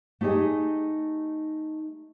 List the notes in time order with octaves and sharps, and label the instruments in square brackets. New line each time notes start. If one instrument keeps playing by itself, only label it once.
[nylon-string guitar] A3 D#4 G4 G#4 D#5